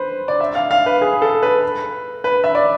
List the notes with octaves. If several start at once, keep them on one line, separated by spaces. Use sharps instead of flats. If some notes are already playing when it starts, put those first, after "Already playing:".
Already playing: B4 C5
D5
E5
F5
F5
B4
G#4
A4
B4
B4
E5
D5